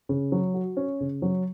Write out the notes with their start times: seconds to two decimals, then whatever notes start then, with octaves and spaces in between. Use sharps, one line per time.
0.09 C#3
0.32 F#3
0.54 F#4
0.77 C#4
1.00 C#3
1.22 F#3